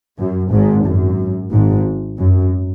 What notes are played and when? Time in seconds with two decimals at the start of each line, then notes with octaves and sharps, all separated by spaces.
0.18 F#2
0.51 G#1 G#2
0.85 F#2
1.51 G#1 G#2
2.19 F#2